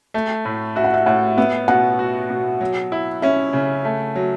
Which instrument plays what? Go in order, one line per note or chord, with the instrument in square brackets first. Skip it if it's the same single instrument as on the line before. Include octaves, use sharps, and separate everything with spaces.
[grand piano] A3
A2
[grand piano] F#4 [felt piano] E5
[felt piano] F#5
E5
[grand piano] A2 [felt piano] F#5
[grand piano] B3 [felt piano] E5
[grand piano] B2 [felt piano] F#5
[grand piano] F#4
B2
F#3
E4
[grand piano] C#4 [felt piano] E5
[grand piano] C#3
A3
F#3